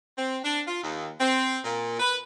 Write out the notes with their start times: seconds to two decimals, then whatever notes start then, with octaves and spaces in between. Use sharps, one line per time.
0.17 C4
0.44 D4
0.68 F4
0.84 D#2
1.20 C4
1.65 A#2
2.00 B4